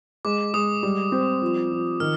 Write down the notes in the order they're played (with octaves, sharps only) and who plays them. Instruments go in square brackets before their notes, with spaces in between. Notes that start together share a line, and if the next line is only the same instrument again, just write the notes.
[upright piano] G#3 [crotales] D6
[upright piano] G#3 [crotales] D#6
[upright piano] G3
C4
F3
F3
[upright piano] D#3 [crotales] F6